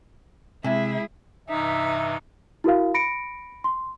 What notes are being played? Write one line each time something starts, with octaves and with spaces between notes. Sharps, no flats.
C3 G#3 E4 G#4 E5 G#6
G2 C3 E3 D#4 E5
E4 F#4 A#4 F5
B5 A#6 C#7 D7
C6